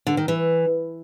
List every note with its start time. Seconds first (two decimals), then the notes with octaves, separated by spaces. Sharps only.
0.07 D3
0.17 D#3
0.28 E3